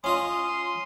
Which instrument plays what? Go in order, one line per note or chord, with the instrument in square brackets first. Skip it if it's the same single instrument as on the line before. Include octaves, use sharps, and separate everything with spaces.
[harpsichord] C#4 F4 D#5 [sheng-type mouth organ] C6 D#6